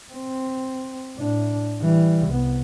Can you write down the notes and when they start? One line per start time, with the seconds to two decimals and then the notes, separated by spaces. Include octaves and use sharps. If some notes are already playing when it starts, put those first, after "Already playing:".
0.12 C4
1.16 A2 D4
1.81 E3 G3
2.28 C2 B3